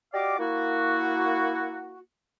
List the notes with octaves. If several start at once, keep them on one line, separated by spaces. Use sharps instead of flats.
F#4 G4 D5 D#5 F5 D6
A#3 E4 F#4